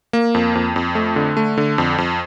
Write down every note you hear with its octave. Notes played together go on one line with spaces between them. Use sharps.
A#3
F2
F2
F2
A3
D3
A3
D3
F2
F2